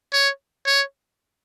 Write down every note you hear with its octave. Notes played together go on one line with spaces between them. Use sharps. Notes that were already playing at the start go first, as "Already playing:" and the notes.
C#5
C#5